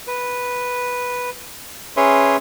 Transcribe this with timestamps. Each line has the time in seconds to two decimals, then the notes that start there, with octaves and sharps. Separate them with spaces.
0.07 B4
1.97 C#4 G#4 B4 C#5 E5 C6